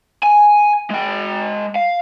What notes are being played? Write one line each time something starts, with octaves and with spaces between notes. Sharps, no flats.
G#5
G#3 G5
F5